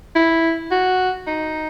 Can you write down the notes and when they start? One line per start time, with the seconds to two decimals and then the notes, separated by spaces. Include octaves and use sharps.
0.15 E4
0.71 F#4
1.27 D#4